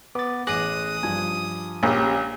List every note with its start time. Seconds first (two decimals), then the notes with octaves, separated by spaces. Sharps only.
0.15 B3 D6 A6
0.47 A1 G#4 D6 D#6 F#6 A#6
1.03 G2 F3 G#5
1.83 A#1 C#4 G4